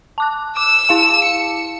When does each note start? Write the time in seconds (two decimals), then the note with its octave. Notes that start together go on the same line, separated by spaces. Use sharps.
0.18 A5 D6 F#6
0.57 D6 E6 E7
0.89 E4 F5 A5
1.24 C#7